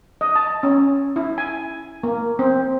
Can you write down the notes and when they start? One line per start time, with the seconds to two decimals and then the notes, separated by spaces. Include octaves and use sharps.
0.21 D#5
0.35 A5
0.63 C#4
1.16 E4
1.38 G#5
2.03 A#3
2.39 C4